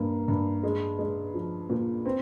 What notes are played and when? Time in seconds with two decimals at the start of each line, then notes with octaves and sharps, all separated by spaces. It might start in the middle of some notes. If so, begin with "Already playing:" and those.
Already playing: G2 A#3
0.28 G2
0.63 G#3
0.99 G#3
1.34 F3
1.70 A#2
2.06 C4